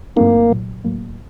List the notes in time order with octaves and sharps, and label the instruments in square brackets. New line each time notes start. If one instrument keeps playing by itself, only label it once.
[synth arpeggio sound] G2 F#3 A3 C4 D#4 [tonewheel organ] A#3
[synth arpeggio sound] C2 A#2 F#3
A2 F#3 A#3